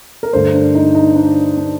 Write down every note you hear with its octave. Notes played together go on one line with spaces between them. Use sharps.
A#4
G2 D3 A3 C5
D4
D#4
D#4
D4
D4